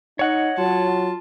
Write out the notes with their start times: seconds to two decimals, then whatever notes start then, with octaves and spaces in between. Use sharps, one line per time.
0.19 D#4 C#5 D#5 F#5
0.58 F#3 F4 A5